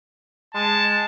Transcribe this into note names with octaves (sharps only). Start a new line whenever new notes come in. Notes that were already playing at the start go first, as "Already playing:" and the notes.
G#3 A5